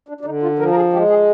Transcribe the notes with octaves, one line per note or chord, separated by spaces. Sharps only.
D4
D4
D3 D#4
F4
F3 A#4
A#4
G#4
G#3 G4
G#4